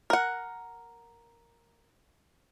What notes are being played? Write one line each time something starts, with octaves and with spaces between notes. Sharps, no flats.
A#4 F#5